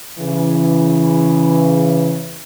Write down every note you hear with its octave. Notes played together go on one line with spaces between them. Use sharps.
C#3 E3